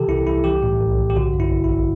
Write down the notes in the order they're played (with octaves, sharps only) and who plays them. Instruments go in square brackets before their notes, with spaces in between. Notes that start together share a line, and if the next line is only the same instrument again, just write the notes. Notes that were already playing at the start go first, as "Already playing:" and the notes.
Already playing: [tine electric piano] C3 E3 G4 A4
C2 E4
C2 E4
E3 G4
A2
B1
B1
G4
D3 F#4
G2
E4
A1
E4
A1